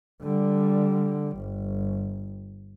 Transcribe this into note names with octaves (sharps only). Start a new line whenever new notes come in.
D3 G3
G1